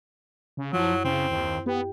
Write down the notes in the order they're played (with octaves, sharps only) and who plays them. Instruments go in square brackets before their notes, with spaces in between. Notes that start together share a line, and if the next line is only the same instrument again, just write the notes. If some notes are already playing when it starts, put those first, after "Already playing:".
[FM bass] C#3
[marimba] F#2 E4 [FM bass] F3 [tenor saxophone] F#3
[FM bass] C#3 [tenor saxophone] C4
[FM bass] D#2
[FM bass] B3 [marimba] G4 G5